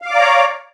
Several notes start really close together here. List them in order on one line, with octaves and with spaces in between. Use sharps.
F5 D6 D5 A#5 C#5